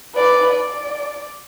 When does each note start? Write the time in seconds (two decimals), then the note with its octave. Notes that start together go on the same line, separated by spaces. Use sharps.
0.15 B4 D5
0.51 D5